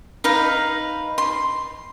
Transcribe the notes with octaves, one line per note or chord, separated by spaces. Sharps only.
D#4 B4 F5
C6